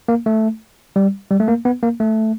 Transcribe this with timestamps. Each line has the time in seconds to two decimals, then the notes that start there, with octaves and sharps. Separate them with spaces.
0.08 A#3
0.26 A3
0.96 G3
1.31 G3
1.40 A3
1.48 A#3
1.65 B3
1.83 A#3
2.00 A3